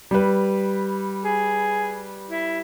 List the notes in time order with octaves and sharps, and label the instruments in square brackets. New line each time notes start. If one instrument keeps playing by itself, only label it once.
[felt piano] G3 B4
[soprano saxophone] G#4
E4